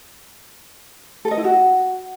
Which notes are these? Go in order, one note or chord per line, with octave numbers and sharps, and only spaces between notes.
A4
D#5
E4
F#4